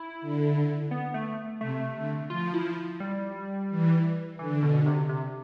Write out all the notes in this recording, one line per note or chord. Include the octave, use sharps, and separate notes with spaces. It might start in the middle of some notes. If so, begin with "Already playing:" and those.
Already playing: E4
D3
B3
A3
C3 A3
D3
F3 F4
E4
G3
E3
D3 E3
B2
C3
C3